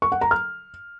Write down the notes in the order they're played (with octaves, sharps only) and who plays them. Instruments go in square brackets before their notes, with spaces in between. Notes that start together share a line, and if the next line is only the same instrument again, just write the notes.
[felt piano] C#6
F#5
A#5
F6